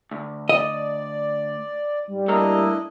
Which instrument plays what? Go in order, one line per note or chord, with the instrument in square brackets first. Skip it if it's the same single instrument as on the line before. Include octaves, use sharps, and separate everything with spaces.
[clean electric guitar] D2
[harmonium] D5 [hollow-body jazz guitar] D#5
[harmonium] G#2 [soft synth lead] G3
[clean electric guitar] A3 A#3 A#4 [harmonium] D4 E4 D#5